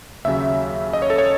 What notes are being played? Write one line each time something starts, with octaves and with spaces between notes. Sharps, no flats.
D#2 C#3 F#3 E5
D#5
C#5
A4
C#5